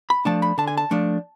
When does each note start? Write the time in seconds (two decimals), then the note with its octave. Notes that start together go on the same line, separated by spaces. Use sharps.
0.10 B5
0.25 F3 A3 D4 A5
0.42 B5
0.58 D3 A5
0.68 G#5
0.78 A5
0.91 F3 A3 D4